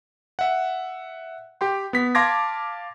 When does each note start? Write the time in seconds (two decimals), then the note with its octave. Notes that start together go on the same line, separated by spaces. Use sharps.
0.39 E5 F#5
1.61 G4 G5 C6
1.93 B3 B6
2.15 F5 A5 C6 D6 G#6 A#6